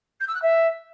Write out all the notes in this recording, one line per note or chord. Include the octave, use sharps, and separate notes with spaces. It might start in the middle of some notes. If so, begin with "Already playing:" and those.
G6
E6
F#6
E5